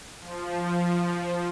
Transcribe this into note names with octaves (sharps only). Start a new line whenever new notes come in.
F3